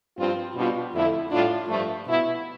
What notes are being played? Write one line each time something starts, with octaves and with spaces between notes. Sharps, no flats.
G2 F3 C4 F4
B2 G3 D4 F4
F2 D3 A3 E4
A2 G3 D4 F4
G2 F3 A3
B2 B3 E4